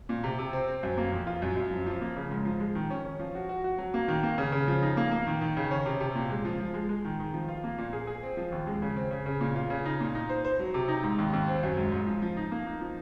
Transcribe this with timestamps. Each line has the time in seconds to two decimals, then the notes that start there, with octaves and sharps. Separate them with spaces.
0.09 A#2
0.24 C3
0.38 C3
0.53 C4
0.68 C4
0.83 F#2
0.98 A#3
1.12 F2
1.27 F4
1.42 F#2
1.57 F#2
1.71 F3
1.86 F3
2.01 A#3
2.16 C#3
2.31 G#2
2.45 F3
2.60 G#3
2.75 D#3
2.90 C#4
3.05 C#4
3.19 F3
3.35 F#4
3.49 F#4
3.64 F#4
3.78 F#3
3.94 A#3
4.08 D#3
4.23 A#3
4.38 C#3
4.52 C#3
4.68 F3
4.82 D#4
4.97 A#3
5.11 A#3
5.27 D#3
5.41 D#3
5.57 C#3
5.71 C#4
5.86 C3
6.00 C3
6.15 A#2
6.30 G#3
6.45 F3
6.60 F3
6.74 G#3
6.89 G#3
7.05 D#3
7.19 D#3
7.33 F3
7.48 F4
7.64 A#3
7.78 A#2
7.93 G#4
8.07 G#4
8.23 C4
8.37 F3
8.52 D#2
8.67 G#3
8.82 C#3
8.97 C4
9.11 C#3
9.26 C#3
9.41 A#2
9.56 F4
9.70 C#3
9.85 D#4
10.00 A#2
10.15 D#4
10.30 C5
10.45 C5
10.59 F#3
10.74 C3
10.88 D#4
11.04 G#2
11.18 D#2
11.33 D#2
11.48 C4
11.63 F#2
11.77 G#2
11.92 G#2
12.07 F3
12.22 F3
12.37 D#4
12.51 A#3
12.66 D#4
12.81 F3